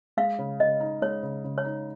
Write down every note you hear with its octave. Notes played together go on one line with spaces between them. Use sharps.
G#3 F5
C#3
C#3 D#5
D#4
G#3 C#5
C#3
C#3
C#5
D#4